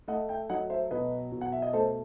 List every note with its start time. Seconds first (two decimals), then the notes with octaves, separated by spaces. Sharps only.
0.08 A3 D#5 F#5
0.29 E5 G5
0.50 F#3 D#5 F#5
0.70 C5 E5
0.91 B2 B4 D#5
1.32 B2
1.41 F#5
1.52 E5
1.62 D#5
1.73 A3 A4 C5